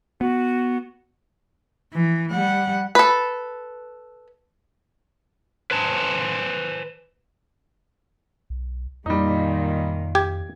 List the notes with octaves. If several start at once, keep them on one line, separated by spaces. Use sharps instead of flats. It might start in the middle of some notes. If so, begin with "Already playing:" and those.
B3 F#4
E3
G3 F#5
A4 B4
B4 C5 G#5 A5
B1
F2 A#2 D#3 G3 D#4
G4 G#6